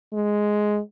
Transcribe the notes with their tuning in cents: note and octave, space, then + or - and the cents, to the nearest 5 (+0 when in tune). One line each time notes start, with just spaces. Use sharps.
G#3 +5